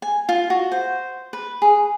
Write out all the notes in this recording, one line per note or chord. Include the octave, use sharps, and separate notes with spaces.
G#5
F4
F#4
C5
B4
G#4